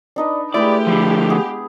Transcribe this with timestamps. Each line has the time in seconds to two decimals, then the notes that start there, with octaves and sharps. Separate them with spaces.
0.16 D4 D#4 B4 D5
0.54 G#3 A3 E4 G4 B4 D5
0.87 D3 F3
1.30 B3 G#4 F5